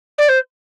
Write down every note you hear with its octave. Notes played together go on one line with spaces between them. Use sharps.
D5
C5